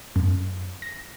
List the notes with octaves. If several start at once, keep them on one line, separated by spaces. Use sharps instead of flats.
F#2
A#6